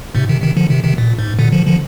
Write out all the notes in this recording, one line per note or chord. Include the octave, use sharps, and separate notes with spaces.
G#2 C3
C3 D#3
C3 D#3
D3 F3
C3 D#3
C3 D#3
A#2
G#2
A#2 D3
D3 F3
D3 F3